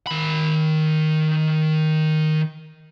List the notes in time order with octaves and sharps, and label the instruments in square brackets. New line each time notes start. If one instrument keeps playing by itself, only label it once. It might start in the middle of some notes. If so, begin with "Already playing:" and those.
[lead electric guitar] D#3 B5